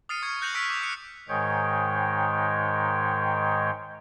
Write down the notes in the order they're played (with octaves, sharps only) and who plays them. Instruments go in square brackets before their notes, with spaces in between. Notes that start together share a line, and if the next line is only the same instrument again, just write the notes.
[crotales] D#6 F6 A6 C7 C#7 D#7
C#6 F6 G#6 C#7
F#6 G6 A#6 C#7 F7 F#7
C#6 E6 F6 B6 D7
D6 F7
D#6 F#6 C#7
[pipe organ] G#2 D#3 G#3 C#5 G5